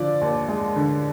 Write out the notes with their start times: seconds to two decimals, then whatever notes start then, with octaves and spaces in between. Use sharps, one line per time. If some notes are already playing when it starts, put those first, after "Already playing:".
Already playing: D3 F3 D5
0.21 D#2
0.48 G#3
0.76 D3